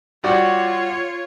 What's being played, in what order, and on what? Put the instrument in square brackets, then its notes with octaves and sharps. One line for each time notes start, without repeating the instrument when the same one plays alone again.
[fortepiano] G3 F#4 D5 [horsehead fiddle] F4 C#5